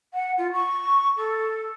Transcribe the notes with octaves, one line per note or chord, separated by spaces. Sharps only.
F#5
F4
C#6
A4